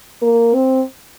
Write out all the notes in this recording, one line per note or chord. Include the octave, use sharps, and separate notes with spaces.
A#3
C4